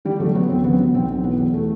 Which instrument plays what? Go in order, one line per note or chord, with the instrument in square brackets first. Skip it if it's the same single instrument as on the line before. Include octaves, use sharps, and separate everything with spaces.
[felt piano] D3 G3
F#3 A3
F#3 B3
D2 C4
F#3 B3
F#3
B1 C4
F#3
E3 B3
E2
A3